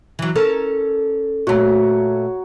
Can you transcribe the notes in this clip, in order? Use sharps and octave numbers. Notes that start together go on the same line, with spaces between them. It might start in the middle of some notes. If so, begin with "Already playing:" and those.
E3 F#3
C#4 A4 A#4
A#2 A3 F#4 C#5 A#5